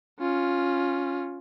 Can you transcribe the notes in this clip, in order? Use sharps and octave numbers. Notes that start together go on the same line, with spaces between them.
C#4 F4